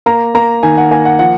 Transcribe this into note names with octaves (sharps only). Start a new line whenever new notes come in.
A#3 A#5
A#3 A#5
D#3 G#5
F#5
A#3 G#5
F#5
F3 F#5